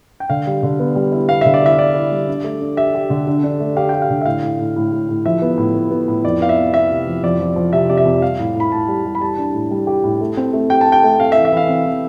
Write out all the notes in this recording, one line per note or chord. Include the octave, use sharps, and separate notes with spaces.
G5
D3 F5
G3
D3
B3
G3
E4
B3 F5
D3 E5
D5
E4 E5
E4 D5
E4
G3
D4
A3
D4
G4 E5
G4
D3
D4
D4
A3
G4 F5
G4 G5
F5
D3
E5
A2 F5
A2
A2
A2
A2
A2
F3 E5
B3
A2
B3
B3
A2
F2 D5
B3 F5
E5
B3
B3 E5
C3
F3
F2 D5
F3
F3
C3 E5
C3 D5
E5
F2
G3 F5
A2
A2 B5
A2 A5
G3
G3
B5
G3 A5
D4
A2
G3
G4
A2
A3
C4
A3
G4 G5
A5
G4
G5
A3
C4 F5
E5
E3
E5
E3 F5
C4
E3